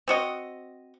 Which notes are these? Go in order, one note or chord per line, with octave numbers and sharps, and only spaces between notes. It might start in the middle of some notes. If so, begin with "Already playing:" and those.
C4 F#4 D#5